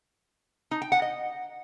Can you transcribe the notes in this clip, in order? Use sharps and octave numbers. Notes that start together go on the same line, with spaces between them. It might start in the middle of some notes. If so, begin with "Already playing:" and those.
D#4
G5
F#5
D#5